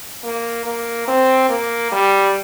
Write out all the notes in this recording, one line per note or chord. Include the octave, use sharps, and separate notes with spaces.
A#3
A#3
C4
A#3
G3